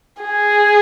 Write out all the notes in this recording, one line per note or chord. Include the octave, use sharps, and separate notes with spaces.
G#4